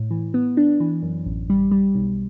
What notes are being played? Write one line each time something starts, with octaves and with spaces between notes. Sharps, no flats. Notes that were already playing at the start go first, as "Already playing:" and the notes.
Already playing: A2
E3
B3
D4
E3
F#2
A1
G3
G3
B1